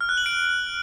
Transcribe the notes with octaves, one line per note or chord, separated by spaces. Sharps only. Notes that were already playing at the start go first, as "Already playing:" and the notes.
F6
F#6
F#7
D7